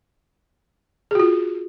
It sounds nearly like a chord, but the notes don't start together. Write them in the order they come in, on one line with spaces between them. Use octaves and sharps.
G#4 F#4 F4